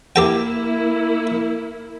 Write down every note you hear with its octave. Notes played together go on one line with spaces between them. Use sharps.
A#3 E4 G4 A4 G5